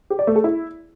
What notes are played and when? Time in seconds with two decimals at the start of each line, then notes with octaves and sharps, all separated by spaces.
0.10 G4
0.19 D5
0.27 A3
0.36 A4
0.44 E4